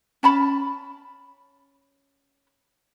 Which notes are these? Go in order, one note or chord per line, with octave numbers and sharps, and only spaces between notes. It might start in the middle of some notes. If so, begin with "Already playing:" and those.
C#4 A5 B5